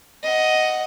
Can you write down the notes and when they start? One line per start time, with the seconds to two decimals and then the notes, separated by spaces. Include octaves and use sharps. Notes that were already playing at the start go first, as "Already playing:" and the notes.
0.23 D#5 F#5